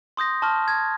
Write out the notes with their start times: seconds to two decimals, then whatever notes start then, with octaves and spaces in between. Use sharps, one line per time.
0.17 C6 D#6 G6 A#6
0.42 A5 C6 C#6 F6
0.68 G#6